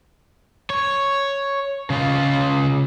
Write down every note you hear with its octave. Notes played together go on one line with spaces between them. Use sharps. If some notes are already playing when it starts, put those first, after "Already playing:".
C#5
C#3 F4